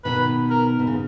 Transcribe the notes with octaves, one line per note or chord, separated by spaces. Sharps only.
B2 D#3 B4
A#4
B2
C#3